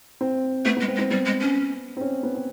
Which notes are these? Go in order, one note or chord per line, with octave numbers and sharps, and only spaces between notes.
C4
A3 B3
G#3 B3
C4
G#3
C4
G3 B3
G#3
C#4
C4
C#4
B3
C4